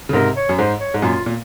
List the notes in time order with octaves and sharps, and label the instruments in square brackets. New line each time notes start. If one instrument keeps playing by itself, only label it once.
[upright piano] C#3
[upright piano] G#2 C3 [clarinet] A#4
[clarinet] C#5
[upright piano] F#2
[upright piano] G#2 [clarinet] C5
[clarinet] C#5
[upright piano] G#2
[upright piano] F#2 A#2 [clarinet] F4
[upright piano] A#2